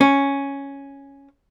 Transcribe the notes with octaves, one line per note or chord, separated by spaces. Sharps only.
C#4